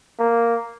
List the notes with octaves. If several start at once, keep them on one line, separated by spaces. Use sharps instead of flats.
A#3